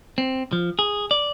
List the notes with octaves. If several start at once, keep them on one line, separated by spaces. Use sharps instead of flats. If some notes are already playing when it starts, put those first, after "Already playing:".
C4
F3
G#4
D5